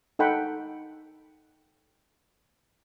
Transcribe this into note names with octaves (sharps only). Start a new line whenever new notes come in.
D#4 A4 F#5 G5 B5